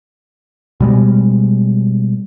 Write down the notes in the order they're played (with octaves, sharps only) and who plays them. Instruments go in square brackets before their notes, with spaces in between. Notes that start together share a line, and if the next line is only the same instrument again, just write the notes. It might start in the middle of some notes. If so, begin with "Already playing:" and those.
[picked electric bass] B2 G3 G#3